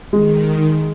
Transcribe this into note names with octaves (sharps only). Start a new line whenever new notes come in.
D#3 G#3